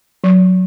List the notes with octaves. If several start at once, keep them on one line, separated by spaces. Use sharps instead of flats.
F#3